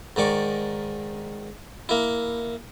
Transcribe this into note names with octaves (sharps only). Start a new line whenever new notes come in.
G#2 D#3 D5 C#6
A#3 E4